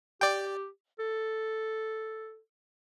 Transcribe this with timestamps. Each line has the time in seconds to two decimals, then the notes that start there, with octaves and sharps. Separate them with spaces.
0.21 G4 D5 G5
0.99 A4